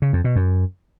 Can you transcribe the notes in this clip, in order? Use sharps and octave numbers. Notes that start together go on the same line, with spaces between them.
C#3
F2
B2
F#2